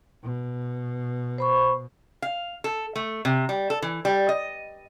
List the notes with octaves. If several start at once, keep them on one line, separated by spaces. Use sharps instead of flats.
B2
C5 B5 C#6
F5
A4
A3
C3
G3
A4
E3
G3
D#5